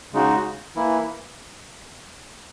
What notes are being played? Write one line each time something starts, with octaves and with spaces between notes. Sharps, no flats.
C#3 G#3 D#4 F#4
E3 A#3 E4